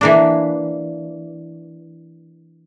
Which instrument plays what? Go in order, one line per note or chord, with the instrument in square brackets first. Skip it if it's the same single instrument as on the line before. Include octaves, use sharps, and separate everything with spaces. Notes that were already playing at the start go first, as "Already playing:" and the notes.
[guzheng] E3 A#3 D4